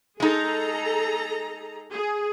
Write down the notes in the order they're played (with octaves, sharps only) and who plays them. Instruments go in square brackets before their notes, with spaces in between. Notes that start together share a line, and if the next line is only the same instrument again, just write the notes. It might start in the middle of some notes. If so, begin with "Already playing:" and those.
[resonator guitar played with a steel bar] G#3 D#4 [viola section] G#4 A4 A#5
[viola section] G#4